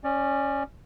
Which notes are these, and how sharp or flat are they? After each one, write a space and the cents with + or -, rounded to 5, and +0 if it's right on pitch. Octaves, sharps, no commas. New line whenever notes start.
C#4 -5 D5 +20